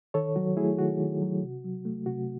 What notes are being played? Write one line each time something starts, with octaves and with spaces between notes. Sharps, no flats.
D#3 A4 C#5
F#3 F#4
A3 E4 G#4
D#3 F#4
D#3
F#3
C3
F#3
A3
C3 F#4